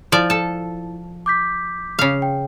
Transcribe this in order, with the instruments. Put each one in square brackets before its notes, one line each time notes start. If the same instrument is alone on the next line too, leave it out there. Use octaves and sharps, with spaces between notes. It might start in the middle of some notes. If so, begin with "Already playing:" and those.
[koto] F3 D5 [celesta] E4
[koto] A4 A5
[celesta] D6 G6 B6
[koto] C#3 F5
[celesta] G5